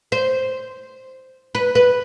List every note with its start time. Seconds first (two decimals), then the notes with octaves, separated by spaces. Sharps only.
0.12 C5
1.55 B4
1.75 B4